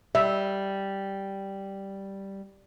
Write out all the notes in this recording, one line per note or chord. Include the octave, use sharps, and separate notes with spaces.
G3 E5